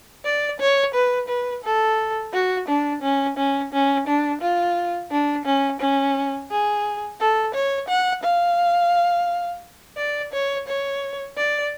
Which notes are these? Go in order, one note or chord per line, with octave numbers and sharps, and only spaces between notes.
D5
C#5
B4
B4
A4
F#4
D4
C#4
C#4
C#4
D4
F4
D4
C#4
C#4
G#4
A4
C#5
F#5
F5
D5
C#5
C#5
D5